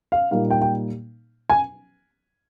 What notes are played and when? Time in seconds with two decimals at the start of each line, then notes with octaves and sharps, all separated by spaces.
0.12 F5
0.31 A#2 G3 A#3 D#4 F5
0.51 G5
0.61 G5
1.50 G#5